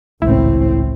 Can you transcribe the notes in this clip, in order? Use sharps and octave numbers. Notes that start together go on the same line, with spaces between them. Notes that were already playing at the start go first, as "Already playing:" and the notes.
G#1 C#2 A2 C4 E4